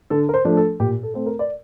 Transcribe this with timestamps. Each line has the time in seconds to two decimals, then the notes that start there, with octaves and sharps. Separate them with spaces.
0.10 D3 A4
0.29 A#4
0.34 C5
0.45 F3 A3 D4
0.57 A4
0.80 A#2 G4
1.03 A4
1.14 A3 C4
1.26 A#4
1.39 D5